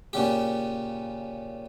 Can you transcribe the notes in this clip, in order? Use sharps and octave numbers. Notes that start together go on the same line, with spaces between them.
A#2 C#3 G4